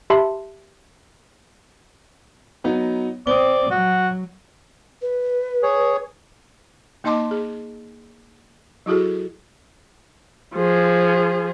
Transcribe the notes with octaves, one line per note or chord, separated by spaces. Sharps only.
G4 E5 A5 B5 C6
F#3 B3 D#4
C4 D5 D#6 G7
F#3 F#4
B4
G#4 C#5
A#3 D#4 D#5 A5 C6 D6
G#4
F#3 E4 F#4 G#4 A4
F3 G#4